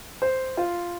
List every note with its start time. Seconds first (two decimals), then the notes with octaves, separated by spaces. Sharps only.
0.22 C5
0.57 F4